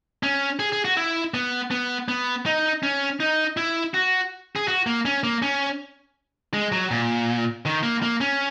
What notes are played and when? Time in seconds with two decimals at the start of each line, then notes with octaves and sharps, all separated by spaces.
0.23 C#4
0.60 G#4
0.72 G#4
0.85 F#4
0.97 E4
1.34 B3
1.71 B3
2.08 B3
2.46 D#4
2.83 C#4
3.20 D#4
3.57 E4
3.94 F#4
4.56 G#4
4.68 F#4
4.86 A#3
5.05 C#4
5.24 A#3
5.42 C#4
6.54 G#3
6.72 F#3
6.91 A#2
7.65 D#3
7.83 A#3
8.02 A#3
8.21 C#4